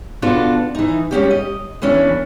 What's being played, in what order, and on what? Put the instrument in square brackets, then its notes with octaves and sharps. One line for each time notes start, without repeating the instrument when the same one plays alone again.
[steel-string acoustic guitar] B2 B3 D4 F4 F#4 A4
E3 D#4
G3 G#3 C#4 D4 F#4 G4
D#5
D#2 E3 B3 C#4 D4